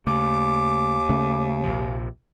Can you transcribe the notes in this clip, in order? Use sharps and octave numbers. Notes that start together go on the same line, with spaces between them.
D#2 C#3 A3 D6
C#3 A3 C#4
A#1 C3 F3